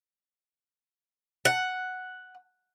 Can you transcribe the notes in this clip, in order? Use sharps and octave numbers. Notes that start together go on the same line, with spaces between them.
F#5